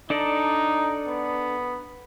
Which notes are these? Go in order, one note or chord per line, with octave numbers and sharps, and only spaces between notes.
D4 D#4 A4 D5
B3